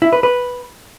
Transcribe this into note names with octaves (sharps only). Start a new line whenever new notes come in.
E4
B4
B4